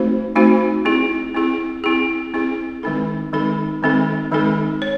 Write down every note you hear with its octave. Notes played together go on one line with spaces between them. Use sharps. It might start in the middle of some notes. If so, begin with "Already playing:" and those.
Already playing: A3 C4 D#4 F#4 C5
A3 C4 D#4 F#4 C5
C4 E4 G#4
C4 E4 G#4
C4 E4 G#4
C4 E4 G#4
D#3 G#3 C4 D#4 A4
D#3 G#3 C4 D#4 A4
D#3 G#3 C4 D#4 A4
D#3 G#3 C4 D#4 A4
C#5